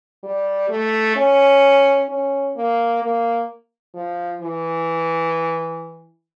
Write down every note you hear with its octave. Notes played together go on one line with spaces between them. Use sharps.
G3
A3
C#4
C#4
A#3
A#3
F3
E3